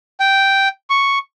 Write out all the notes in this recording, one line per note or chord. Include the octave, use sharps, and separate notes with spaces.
G5
C#6